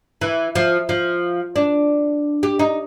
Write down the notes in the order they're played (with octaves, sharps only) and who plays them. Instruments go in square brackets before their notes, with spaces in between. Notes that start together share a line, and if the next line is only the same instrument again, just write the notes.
[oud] E3
F3
F3
D4
G4
D#4